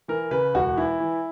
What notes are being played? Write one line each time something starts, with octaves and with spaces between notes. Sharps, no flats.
E3 A#4
C#3 B4
E1 F#4
E3 E4
E3